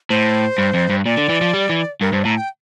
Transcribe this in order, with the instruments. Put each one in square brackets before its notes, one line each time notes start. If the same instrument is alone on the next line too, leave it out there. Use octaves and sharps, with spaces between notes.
[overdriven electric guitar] A2 [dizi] C5
[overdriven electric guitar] G2
F2
G2
[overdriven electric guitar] A#2 [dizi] D5
[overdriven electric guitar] D3
E3
F3
G3
E3
[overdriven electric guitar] G2 [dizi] A#4
[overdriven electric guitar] G2 [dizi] C5
[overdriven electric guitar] A2 [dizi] A#5
[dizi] G5